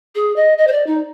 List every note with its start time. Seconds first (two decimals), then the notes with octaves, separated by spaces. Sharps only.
0.15 G#4
0.36 D#5
0.58 D#5
0.67 C5
0.72 D5
0.87 D#4